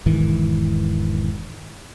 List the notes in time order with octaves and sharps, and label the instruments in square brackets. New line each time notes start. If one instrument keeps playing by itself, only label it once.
[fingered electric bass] E1 G#2 D#3 E3